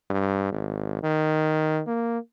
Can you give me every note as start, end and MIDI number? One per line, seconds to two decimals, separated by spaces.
0.10 0.48 43
0.52 1.01 32
1.03 1.81 51
1.87 2.18 58